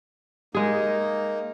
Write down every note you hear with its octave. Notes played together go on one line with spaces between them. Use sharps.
G#3 A#3 D#4 G#4